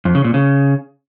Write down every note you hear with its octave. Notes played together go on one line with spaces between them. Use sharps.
F2
C#3
A#2
C#3